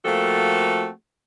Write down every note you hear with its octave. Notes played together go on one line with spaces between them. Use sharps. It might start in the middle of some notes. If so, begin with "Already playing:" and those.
F3 A3 A#3 C4 F#4 A4